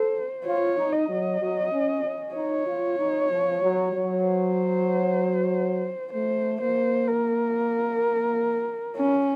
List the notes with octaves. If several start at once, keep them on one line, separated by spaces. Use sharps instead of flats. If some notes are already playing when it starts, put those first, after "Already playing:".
Already playing: A4 C5
F4 C#5
D#4
D#5
F#3
F#3
C#4
C#4
D#4 C#5
F4
D#4
F3
F#3
F#3
C5
A3 C5
A#3 C5
A#4
C#4